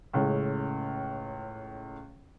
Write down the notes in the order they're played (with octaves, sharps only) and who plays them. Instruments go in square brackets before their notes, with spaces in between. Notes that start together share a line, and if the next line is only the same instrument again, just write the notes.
[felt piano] C#2 A2 G#3